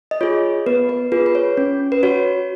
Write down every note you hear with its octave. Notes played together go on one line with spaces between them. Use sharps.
D#5
F4 G#4 C#5
B3 B4
B4
F4 G#4 B4
B4
C#5
C#4
B4
F#4 C#5